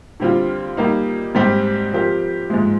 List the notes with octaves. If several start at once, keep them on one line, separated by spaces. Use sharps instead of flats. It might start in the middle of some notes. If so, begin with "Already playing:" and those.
D3 G3 C4 F4
G3 A#3 D#4
G#2 G3 C4 G4
F3 C4 G4 A#4
G#2 F3 G#3